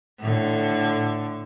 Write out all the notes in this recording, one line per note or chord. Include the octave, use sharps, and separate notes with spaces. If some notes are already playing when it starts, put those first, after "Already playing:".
A2 D3